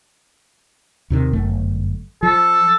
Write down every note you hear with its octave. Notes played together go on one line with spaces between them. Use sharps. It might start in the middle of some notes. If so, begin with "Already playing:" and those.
D#2 C3 D#3
G1 F#2 A3
F3 A4